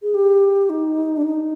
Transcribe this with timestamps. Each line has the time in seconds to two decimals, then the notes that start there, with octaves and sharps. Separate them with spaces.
0.02 G#4
0.14 G4
0.70 D#4
1.17 D4
1.26 D#4